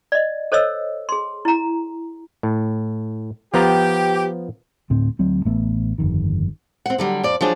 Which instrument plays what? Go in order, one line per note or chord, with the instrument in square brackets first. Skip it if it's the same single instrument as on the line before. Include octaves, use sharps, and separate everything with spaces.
[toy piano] D5 D#5
A4 C5 C#5 D#5 E6
G#4 C6
E4 A#5
[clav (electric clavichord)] A2
[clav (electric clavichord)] F3 B3 A#5 [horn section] G4
[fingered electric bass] D2 A2 C4
D2 F#3 C4
A1 A3 B3
G1 F2 D#3
[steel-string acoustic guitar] C4 F#5
D3 F#3 G3
F2 D5
F3 F#3 D4 G#4